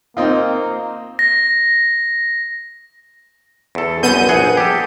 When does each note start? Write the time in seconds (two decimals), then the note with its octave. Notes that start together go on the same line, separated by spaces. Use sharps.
0.17 A#3 C4 D#4 F4
1.19 A#6
3.75 E2 A4
4.03 C2 F#2 B3 G6 D#7
4.29 A#1 G#4 F#5
4.57 G4 A4